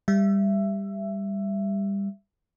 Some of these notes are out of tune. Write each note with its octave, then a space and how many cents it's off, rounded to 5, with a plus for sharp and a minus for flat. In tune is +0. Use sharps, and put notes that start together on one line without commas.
G3 +20 E5 +20